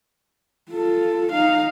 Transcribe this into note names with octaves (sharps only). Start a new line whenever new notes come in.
F4 A4
D#4 F5